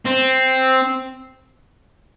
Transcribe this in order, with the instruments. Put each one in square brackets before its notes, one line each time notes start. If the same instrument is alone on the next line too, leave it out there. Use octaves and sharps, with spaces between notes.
[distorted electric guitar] C4